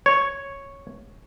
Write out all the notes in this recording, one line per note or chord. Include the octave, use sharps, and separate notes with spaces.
C#5